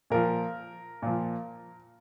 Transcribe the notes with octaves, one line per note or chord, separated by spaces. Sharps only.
A#2 F3 A#4
A#2 F3